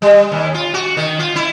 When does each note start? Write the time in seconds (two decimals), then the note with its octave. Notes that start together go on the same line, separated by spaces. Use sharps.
0.02 G3
0.32 D#2
0.54 F4
0.74 F#4
0.97 D#3
1.19 F4
1.36 E4